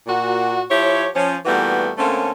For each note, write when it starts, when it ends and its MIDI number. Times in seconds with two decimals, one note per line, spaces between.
0.07 0.61 46
0.07 0.61 66
0.70 1.07 53
0.70 1.07 64
0.70 1.07 67
0.70 1.07 73
1.15 1.36 53
1.15 1.36 61
1.46 1.90 46
1.46 1.90 52
1.46 1.90 55
1.46 1.90 57
1.46 1.90 59
1.46 1.90 66
1.97 2.32 50
1.97 2.32 57
1.97 2.32 58
1.97 2.32 60
1.97 2.32 61